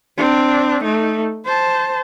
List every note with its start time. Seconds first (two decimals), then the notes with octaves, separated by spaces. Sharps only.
0.17 C4 D4
0.83 A3 D#4
1.45 C5 A5